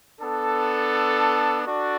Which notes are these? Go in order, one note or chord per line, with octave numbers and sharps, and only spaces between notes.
B3 D4 A4
D4 F#4 A4 D5